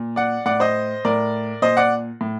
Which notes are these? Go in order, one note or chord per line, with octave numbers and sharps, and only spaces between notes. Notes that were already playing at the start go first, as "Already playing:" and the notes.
Already playing: A#2
D5 F#5
A2 D5 F#5
C5 D#5
A2 A#4 D5
A#2 C5 D#5
D5 F#5
A2